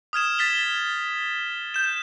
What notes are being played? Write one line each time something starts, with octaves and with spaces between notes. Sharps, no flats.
D#6 F6 G#6 E7
A6 B6 E7 G7
G6 E7